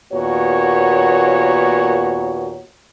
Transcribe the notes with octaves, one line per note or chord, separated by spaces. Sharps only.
D#2 A#2 B3 F#4 C#5